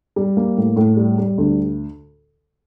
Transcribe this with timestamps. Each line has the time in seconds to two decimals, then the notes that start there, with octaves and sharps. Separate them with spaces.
0.16 G3
0.37 A#3
0.57 A2
0.76 A2
0.97 G3
1.18 G3
1.38 D2